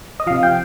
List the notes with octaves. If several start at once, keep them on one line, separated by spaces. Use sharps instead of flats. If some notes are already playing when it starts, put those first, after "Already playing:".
D#5
C3 F3 F5
G5